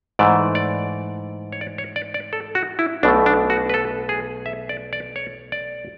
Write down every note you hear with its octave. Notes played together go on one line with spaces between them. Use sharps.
G#2 E3 A3 D5
D5
C#5
D5
C#5
D5
D5
A4
F#4
E4
B1 B2 A3 D4
D4
F#4
B4
A4
G#4
E5
D5
D5
C#5
D5